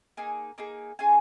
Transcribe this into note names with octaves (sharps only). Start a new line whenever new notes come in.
A#3 D#4 G#4 G#5
A#3 D#4 G#4 A#5
C#4 F4 G#4 G#5